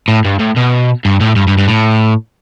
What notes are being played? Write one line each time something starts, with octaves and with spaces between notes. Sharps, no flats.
A2
G2
A2
B2
G2
A2
G2
G2
G2
A2